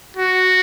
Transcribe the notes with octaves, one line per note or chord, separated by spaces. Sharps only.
F#4